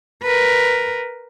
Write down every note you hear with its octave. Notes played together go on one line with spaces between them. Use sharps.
A#4 B4